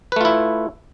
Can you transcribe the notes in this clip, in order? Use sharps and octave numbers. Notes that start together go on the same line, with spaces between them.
A3 E4 F4 B4